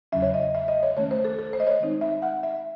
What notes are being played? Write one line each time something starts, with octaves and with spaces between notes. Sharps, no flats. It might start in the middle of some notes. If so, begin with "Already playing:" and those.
E2 C#3 F#3 C#4 E5
C#5
D#5
E5
D#5
C#5
D#3 A3 C#4 C#5
C5
A4
A4
C5
D#5
C#5
D#3 G#3 C4 D#4
E5
F#5
E5